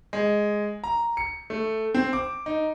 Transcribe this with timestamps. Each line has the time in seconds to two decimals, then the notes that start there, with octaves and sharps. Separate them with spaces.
0.13 G#3
0.84 A#5
1.17 C#7
1.50 A3
1.95 C4
2.13 D6
2.46 D#4